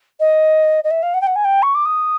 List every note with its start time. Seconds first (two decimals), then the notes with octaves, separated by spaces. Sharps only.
0.20 D#5
0.84 D#5
0.91 E5
1.03 F5
1.14 F#5
1.21 G5
1.27 F#5
1.36 G#5
1.44 G5
1.62 C#6
1.75 D6
1.85 D#6